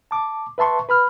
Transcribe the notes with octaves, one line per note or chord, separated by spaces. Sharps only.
A5 D6
B4 E5 A5 C6 C#6
B4 B5 F6